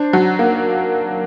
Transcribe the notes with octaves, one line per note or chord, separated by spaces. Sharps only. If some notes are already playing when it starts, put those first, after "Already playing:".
Already playing: D4 C5
F#3
A#3